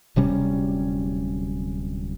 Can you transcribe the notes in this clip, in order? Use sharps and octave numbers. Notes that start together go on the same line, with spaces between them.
D1 C3 G3 C#4